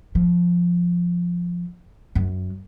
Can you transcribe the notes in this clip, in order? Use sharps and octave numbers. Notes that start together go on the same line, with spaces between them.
F3
F#2